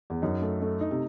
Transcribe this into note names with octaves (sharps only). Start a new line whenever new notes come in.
E2
F#2 D#4
A3
A3
D#4
C3